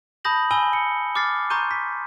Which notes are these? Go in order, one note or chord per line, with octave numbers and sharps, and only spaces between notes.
A5 B5 D#6 G6 A#6 F#7
G#5 B5 E6 D#7 G7
C#7
D6 F6 A6 C7
A#5 C6 C#6 G6 D#7
B6